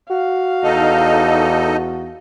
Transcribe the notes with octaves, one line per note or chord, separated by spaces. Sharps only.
F#4 F5
E2 D#4 A4 D#5